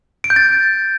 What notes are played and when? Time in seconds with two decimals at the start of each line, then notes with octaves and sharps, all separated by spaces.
0.24 D7
0.30 G6
0.36 A6